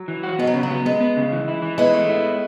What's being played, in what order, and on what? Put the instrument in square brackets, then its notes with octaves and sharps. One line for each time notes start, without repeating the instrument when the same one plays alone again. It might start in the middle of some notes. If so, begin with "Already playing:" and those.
Already playing: [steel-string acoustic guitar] F#3
[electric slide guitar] E3
F#4
[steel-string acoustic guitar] G#3 [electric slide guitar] B3
[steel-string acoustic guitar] F#3
[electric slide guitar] C#3
[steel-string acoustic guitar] F#3
[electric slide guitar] B3
[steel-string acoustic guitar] G#3 [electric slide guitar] B3
[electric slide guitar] B3
C#3
E3
E4
E3
[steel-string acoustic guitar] G#3 B3 [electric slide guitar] E4
[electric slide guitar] A3
E4